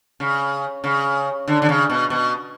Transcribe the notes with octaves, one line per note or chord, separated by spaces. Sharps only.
C#3
C#3
D3
D3
C#3
B2
B2